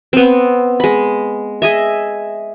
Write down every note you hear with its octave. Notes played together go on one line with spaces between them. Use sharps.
B3 C4
G#3 B5
G#4 D#5 E5